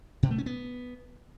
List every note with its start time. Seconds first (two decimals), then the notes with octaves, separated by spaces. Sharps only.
0.23 B2
0.31 A3
0.38 C#4
0.46 B3